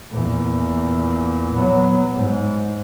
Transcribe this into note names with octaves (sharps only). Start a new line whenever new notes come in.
E2 A#2
F#3 B3
G#2